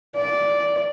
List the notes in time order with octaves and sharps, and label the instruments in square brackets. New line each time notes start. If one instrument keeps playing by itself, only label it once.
[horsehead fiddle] D5